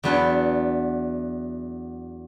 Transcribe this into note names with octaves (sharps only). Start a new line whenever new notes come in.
E2 F#3 B3 D4 B4 G5